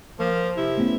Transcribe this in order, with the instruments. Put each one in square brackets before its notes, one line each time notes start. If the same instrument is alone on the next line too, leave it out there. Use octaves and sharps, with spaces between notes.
[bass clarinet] F3 [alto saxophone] A#3
[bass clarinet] C3 [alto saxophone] E4
[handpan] A3 B3 C#4